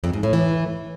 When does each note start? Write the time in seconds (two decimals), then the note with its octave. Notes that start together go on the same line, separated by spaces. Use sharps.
0.04 F2
0.13 G#2
0.23 A2
0.33 E3